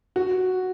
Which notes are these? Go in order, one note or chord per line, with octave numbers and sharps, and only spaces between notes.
F#4